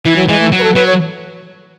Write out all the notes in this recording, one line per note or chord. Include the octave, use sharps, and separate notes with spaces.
E3 E4
F#3
E3 G#3
A3
F#3
B4
A4
F#3 B4
C#5